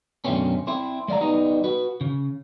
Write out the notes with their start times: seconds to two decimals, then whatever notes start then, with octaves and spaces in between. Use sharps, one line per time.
0.25 F#2 B2 D3 A3 C4 C#4
0.67 C4 E4 C5
1.08 G#3 D5 E5 A#5
1.21 G3 B3 D#4 D#5
1.64 F#4 B4
2.01 C#3